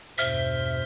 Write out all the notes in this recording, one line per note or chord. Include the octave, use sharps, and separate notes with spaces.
E2 G2 B2 C5 E5 F6 B6